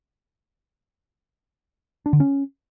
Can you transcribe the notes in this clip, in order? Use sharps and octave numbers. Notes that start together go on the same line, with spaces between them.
D4
D3
C#4